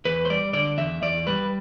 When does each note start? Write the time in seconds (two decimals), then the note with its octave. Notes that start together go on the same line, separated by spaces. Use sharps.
0.05 E2 B4
0.25 C5
0.30 G3 D5
0.53 D3 D5
0.78 E2 E5
1.02 E2 D5
1.27 G3 B4